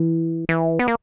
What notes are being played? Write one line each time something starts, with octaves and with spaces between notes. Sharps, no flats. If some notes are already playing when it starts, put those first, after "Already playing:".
Already playing: E3
E3
B3
A#3